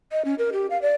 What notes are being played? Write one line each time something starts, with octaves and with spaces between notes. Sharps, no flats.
D#5
C#4
A#4
G4
F5
D5